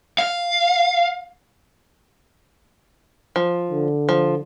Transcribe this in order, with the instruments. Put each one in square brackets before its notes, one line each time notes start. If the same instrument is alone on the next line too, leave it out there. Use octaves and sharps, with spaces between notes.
[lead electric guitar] F5
[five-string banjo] F3
[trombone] D3
[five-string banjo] F3